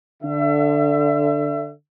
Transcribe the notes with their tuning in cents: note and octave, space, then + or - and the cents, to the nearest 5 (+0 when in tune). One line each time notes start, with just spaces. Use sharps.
D3 +0 E5 +35